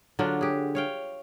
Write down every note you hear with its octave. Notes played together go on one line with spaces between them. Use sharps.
D3 F#3 D4 F4
G4 G#4
C#5 F5 G5